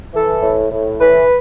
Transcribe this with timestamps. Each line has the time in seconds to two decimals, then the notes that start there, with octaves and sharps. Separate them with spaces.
0.14 E3 A4
0.42 A2
0.71 A2
0.99 E3 B4